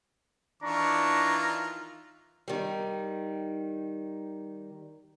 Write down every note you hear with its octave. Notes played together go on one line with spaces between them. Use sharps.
D#3 E3 D4 F4 A#5 C#6
D#3 G3